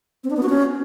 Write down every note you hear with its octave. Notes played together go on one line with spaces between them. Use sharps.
C4
D4
B3
F#4
C#4